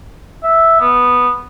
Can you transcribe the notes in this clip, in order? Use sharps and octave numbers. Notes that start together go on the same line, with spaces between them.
E5
B3